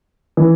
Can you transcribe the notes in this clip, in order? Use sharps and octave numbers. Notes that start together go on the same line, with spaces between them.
E3